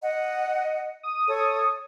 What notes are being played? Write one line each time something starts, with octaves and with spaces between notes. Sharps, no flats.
D#5 F#5
D#6
A4 C#5